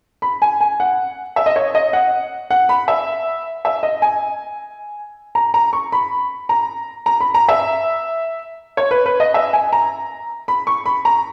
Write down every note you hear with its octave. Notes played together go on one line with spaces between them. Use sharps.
B5
G#5
G#5
F#5
E5
D#5
C#5
D#5
F#5
F#5
B5
E5
E5
D#5
G#5
A#5
A#5
C#6
B5
A#5
A#5
B5
A#5
E5
C#5
B4
B4
D#5
E5
G#5
A#5
B5
C#6
B5
A#5